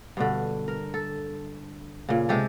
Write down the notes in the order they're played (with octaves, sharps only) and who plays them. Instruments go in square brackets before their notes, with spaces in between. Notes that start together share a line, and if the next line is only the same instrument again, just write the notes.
[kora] G2 B2 D3
A#4
A4
A#2 C#3
C3 G#3 G4 A4